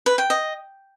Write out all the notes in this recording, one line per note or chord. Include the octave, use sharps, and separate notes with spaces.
B4
G5
D#5